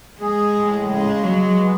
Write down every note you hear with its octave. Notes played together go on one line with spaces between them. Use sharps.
G#3 G#4
A2
C#3 G#3
F#3 G#3
B3